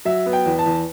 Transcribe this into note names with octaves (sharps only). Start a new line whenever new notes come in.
F#3 E5
B3
G5
E2
A5
E2